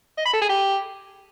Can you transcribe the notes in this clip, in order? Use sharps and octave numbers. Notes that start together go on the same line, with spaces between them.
D#5
B5
A4
G#4
G4